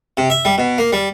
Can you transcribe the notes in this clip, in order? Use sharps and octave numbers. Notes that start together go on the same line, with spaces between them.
C3
E5
G3
B2
A#3
G3